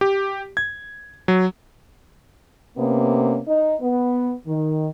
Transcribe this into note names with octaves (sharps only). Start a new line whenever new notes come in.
G4
G#6
F#3
C3 A#3 B3 C#4
D#4
B3
D#3